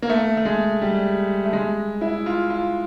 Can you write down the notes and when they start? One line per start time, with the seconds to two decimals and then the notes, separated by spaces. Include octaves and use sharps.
0.02 A#3
0.10 A3
0.37 A3
0.45 G#3
0.82 G3
1.46 A3
1.53 G#3
2.01 E4
2.26 F4
2.50 F4